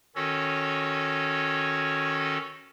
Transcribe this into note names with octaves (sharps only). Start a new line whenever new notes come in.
D#3 C#4 F#4 A4 C#5